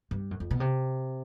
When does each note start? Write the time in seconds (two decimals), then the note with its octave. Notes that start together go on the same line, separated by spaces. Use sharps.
0.11 G2
0.31 F#2
0.40 F2
0.51 B2
0.60 C3